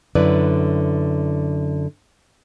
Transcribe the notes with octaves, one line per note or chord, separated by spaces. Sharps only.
F#2 D3 E4 B4 D5